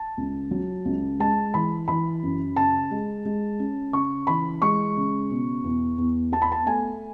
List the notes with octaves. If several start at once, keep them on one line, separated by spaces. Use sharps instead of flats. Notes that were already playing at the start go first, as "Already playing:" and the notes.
Already playing: A5
C#2
F#3
C#2
G#3 A5
E3 B5
E3 B5
F#2
C#3 A5
G#3
G#3
C#4
C#3 C#6
E3 B5
G#3 C#6
C#3
B2
E2
E2
B3 A5
B5
A5
A3 G#5